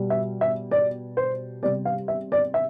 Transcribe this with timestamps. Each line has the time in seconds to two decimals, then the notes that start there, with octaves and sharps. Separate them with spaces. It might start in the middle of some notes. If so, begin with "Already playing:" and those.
Already playing: B2 G3
0.10 E5
0.41 E5
0.71 D5
1.17 C5
1.63 C3 G3 D5
1.85 F5
2.08 E5
2.32 D5
2.54 E5